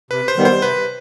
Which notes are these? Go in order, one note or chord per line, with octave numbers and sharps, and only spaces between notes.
C3 B4
C5
D#3 G3 B3
C5
C3 B4